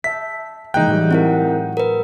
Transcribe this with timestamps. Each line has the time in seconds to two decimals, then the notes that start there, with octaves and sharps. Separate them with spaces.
0.04 E5 A5 G6 B6
0.74 E3 G#3 A#3 D#4 G5 F#6
0.87 A2 F#3 G3
1.11 C4 E4 A#4 F#5
1.77 A#4 B4